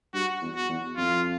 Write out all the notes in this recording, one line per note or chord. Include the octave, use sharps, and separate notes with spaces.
G2 F#4
E2
F#4
E2
F2 F4